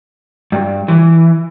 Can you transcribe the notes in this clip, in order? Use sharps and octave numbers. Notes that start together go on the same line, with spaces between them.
G2
E3